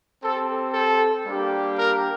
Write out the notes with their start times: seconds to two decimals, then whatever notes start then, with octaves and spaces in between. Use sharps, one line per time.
0.23 C4 G4 A4
0.74 A4
1.26 G3 A#3 D4 G4
1.77 A#4